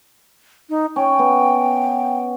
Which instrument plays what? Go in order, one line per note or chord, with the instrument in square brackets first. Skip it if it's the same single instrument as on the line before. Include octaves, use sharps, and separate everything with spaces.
[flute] D#4
[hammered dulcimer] C#4 [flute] G5
[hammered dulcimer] B3